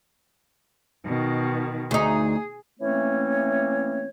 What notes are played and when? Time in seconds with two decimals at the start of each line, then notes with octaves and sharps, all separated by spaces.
1.06 B2 D#3
1.91 D2 D#4 G#4
2.80 E3 A3 A#3 C4 C#4 C#5